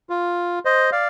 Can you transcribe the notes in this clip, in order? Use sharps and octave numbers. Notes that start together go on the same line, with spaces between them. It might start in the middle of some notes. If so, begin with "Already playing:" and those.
F4
C5 D#5
D5 F5